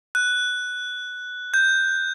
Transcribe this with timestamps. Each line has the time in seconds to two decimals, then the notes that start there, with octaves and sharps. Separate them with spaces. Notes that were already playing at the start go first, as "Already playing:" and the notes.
0.15 F#6
1.54 G6